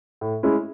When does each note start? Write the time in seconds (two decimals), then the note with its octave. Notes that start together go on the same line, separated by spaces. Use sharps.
0.21 A2
0.43 G#3 C#4 E4